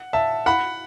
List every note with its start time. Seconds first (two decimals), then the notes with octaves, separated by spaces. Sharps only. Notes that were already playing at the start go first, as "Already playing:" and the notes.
Already playing: F#5
0.13 E5 A5
0.46 F#5 B5